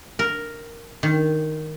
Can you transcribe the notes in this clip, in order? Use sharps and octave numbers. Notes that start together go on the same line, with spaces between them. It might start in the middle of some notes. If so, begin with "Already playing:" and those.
A#4
D#3